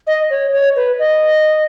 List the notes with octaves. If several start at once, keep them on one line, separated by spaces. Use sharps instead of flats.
D#5
C#5
C#5
B4
D#5